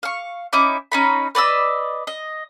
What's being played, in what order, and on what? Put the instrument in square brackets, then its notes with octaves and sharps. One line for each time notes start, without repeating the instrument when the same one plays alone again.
[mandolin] F5 C#6
C#4 D#4 E4 D6
C#4 D#4 B5
B4 D5 D#5 E6
D#5